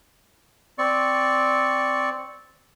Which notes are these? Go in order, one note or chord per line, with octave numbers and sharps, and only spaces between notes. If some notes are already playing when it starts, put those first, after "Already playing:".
C4 D5 C#6